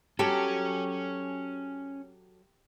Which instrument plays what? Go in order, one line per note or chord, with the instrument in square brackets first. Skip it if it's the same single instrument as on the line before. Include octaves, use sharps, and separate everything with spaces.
[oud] F#3 A4 [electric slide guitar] C#4 [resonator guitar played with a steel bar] G4